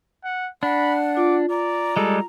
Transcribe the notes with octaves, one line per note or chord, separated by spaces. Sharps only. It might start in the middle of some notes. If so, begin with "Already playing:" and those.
F#5
D4 F#5 B5
F4 D6
D5 A#5
G3 G#3 A4